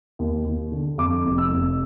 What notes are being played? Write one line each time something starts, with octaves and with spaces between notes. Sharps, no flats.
D#2
D#2
D3
F2 D6
F1
E6
F1